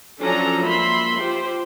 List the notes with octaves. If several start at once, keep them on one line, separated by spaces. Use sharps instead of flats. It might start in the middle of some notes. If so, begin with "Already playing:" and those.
F3 F#3 C#4 D4 A4 A#5
A#3 E5 B5 C6
F4 G4 C5